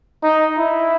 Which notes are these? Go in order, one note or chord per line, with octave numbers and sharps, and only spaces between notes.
D#4
E4